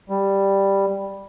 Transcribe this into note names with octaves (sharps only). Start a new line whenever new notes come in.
G3